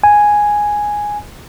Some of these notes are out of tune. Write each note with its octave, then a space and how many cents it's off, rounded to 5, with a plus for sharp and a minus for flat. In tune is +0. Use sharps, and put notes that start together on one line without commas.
G#5 +0